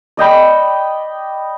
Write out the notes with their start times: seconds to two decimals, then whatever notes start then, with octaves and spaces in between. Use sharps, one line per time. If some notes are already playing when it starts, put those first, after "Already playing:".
0.17 D5 D#5 G5 B5